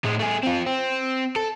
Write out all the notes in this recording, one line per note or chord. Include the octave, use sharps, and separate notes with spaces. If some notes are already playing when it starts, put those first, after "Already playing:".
A2 G#3
A3 G#4
C4 F4
C4
A4